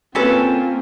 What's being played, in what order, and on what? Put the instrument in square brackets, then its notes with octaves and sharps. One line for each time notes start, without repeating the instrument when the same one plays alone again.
[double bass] A#3 [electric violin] C4 F4 [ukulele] C#4 A4 B4